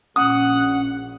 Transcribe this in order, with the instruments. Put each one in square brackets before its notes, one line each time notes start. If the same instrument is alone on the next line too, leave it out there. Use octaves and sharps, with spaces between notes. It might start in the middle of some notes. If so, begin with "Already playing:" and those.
[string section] A#1 [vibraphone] C#4 [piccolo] F#5 [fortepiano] D#6